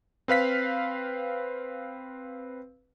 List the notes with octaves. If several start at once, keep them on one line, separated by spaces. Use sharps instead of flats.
C4 B4 F5 B6